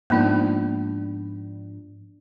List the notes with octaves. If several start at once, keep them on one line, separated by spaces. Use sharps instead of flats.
G#2 F3 A#3 B3 D4 D#4